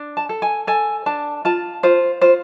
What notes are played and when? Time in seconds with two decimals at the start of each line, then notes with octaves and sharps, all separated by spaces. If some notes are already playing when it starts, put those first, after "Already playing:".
Already playing: D4
0.17 A5
0.29 A4
0.42 G#5
0.67 A4 G#5
1.06 D4 A5
1.45 F4 A5
1.83 F4 C5
2.21 F4 C5